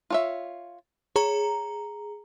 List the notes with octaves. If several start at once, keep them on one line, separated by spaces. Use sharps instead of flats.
F4 C#5 E5
G#4 C#5 A#5